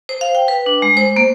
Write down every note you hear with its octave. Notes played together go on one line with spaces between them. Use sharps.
C5
F5
G5
B4
D4
G#3
C5
A#3